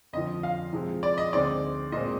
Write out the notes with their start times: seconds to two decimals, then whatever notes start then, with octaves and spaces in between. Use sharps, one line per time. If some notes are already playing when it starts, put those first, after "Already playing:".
0.13 F2 D3 F3 D#5
0.43 F5
0.73 C3 F3 G#3
1.03 D5
1.18 D#5
1.33 D2 D3 G#3 C4 D#4 D5
1.92 A#2 G#3 C4 D#5